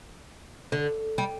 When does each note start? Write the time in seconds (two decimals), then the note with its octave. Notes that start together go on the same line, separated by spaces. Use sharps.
0.72 D3
1.18 G3